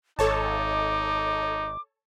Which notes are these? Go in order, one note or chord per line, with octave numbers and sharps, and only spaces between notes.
G#1 D#4 A4 C#5 A5 D6